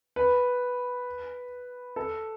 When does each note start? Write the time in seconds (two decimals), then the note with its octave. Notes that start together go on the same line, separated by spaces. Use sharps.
0.16 B4
1.96 A4